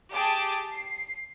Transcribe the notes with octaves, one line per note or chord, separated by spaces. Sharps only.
G4 G#4 A5 D6
C7